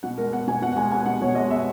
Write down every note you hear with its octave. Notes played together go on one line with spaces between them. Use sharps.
B2 F#5
G#3 A#4
B3 F#5
B2 G#5
B2 F#5
F#5
G#3 G#5
B3 G#5
B2 F#5
B2 C#5
G#3 D#5
B3 E5